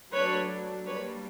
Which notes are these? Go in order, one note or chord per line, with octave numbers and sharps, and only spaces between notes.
F#3 A3 D4 B4 C#5
G3 A#3 D4 B4 C#5